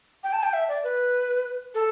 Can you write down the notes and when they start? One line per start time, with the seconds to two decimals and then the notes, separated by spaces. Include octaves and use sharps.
0.24 G5
0.33 A5
0.43 G5
0.53 E5
0.68 D5
0.84 B4
1.74 A4